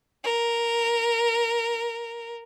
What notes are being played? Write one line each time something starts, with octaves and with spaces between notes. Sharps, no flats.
A#4